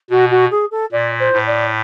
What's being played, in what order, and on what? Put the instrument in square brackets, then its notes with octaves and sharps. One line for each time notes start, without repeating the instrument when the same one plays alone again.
[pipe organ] B2 [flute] F#4
[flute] F#4
G#4
A4
[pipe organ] A#2 [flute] D5
[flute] C5
[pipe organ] A2
[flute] D5